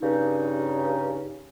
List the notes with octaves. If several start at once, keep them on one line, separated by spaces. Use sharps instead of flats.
G2 C#3 D#4